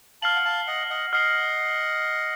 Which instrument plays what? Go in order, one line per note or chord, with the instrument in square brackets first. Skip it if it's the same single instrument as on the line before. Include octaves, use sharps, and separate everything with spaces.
[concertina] F5 A5 [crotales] F6 C7 F#7
[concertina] F#5
F5 A5
D#5 F#5
D#5 F#5
[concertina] D#5 F#5 [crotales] F6 C7 F#7